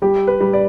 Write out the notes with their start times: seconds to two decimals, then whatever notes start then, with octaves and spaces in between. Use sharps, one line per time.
0.02 G3 G4
0.27 B4
0.40 G3
0.53 D5